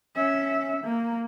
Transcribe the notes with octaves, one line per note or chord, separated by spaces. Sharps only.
C#4 E5
A#3